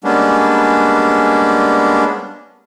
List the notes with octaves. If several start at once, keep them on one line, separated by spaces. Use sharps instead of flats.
G3 G#3 A#3 B3 C#4 D4